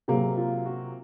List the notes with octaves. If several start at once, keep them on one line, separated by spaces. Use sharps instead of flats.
C3 F#3 A#3 G#4
F4
F#4